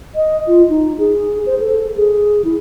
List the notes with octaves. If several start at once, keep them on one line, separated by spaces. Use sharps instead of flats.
D#5
F4
D#4
G#4
C5
A4
G#4
E4